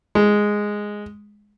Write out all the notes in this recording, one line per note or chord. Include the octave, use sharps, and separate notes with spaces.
G#3